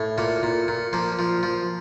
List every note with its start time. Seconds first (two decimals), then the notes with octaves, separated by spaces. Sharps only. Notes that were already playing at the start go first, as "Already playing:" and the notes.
Already playing: A2
0.18 A#2 A#3
0.43 A#2
0.68 A#2
0.93 F3 A#3
1.19 F3
1.43 F3